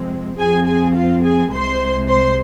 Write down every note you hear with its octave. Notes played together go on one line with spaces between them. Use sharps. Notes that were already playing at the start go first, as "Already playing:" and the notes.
Already playing: F2 C3 G#3 C4
F2 F3 C4 G#4 G#5
G#4 G#5
F4 F5
G#4 G#5
C2 C3 G#3 C5 C6
C5 C6